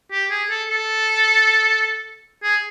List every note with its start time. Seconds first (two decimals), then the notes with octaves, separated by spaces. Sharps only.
0.12 G4
0.31 G#4
0.50 A4
0.70 A4
2.43 G#4